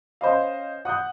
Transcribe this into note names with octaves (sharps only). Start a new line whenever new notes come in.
C#4 C5 D#5 F5
F#5 D#6 F#6 G6